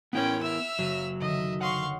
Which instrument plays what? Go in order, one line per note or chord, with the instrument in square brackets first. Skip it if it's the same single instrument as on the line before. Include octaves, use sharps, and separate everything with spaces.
[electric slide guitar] B3 E4 A#4 [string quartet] C#4 G5
[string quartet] E5 E6 F6
[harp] F#1 B6 D#7 [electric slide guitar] F#3
[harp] D3 D#3 [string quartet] D#5 E5
[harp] C#5 D#5 F#5 [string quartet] F5 C6 C#6